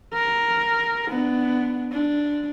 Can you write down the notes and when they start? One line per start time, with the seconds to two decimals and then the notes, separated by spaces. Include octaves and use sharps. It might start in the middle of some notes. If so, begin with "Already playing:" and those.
0.13 A#4
1.08 B3 D4
1.92 D4